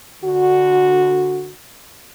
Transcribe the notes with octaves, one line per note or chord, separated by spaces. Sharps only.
D3 F#4